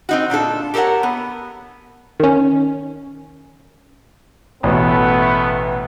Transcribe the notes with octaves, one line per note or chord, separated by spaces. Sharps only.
C4 D#4 F#4
A#2 D4 F4 A4
G4 A4 A#4 C5 C#5 F#5
B3
D#3 C#4
A1 B2 A3 B3